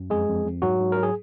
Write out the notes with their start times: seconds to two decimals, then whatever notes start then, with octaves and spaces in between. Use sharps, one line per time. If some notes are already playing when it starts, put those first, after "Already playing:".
Already playing: F#2
0.10 F2 G#3 G#4
0.28 F2
0.45 F2
0.62 G#2 F#3 F#4
0.80 G#2
0.92 F#3 A#4
1.03 G#4